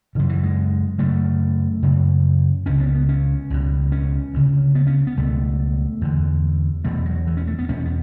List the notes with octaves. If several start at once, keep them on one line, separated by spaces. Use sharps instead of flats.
F#2 C#3 E3
E3
G#3
F#2 C#3 A3
F#2 C#3
C#2 C#3 C#4
B3
B3
C#4
C#2 B2
C#4
D2 C#3
B3
C#4
B3
C#2 B2 A3
E2 D3
E2 B2 A3
F#3
E3
C#4
A3
B3
E2 B2 C#4
B3